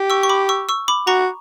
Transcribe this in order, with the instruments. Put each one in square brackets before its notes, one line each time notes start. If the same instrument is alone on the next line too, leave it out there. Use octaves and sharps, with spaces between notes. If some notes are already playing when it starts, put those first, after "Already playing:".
Already playing: [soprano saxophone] G4
[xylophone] C#6 E6
C#6
B5 D6
C#6 E6
C#6 E6
B5 D6
[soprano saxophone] F#4 [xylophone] A#5 C#6